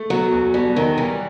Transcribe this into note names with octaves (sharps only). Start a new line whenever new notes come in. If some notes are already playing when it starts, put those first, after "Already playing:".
Already playing: A3
F#3 B3
E2
B2 G3
D#3 F#3
E3 G3